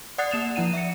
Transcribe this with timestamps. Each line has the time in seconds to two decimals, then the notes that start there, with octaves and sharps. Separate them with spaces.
0.18 D5 F#5 D#6 F#6 A6 C7
0.31 A#3 E7 F7
0.56 F3 E4 F#5 D#7
0.73 E5 C#7